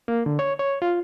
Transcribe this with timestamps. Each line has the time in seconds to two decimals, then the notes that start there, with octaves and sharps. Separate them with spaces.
0.08 A#3
0.26 D3
0.39 C#5
0.59 C#5
0.82 F4